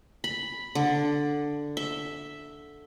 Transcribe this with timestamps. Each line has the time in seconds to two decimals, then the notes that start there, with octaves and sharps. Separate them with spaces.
0.24 B5
0.75 D3
1.77 E5